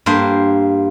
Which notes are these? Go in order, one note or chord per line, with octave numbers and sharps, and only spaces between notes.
G2 A#3 C5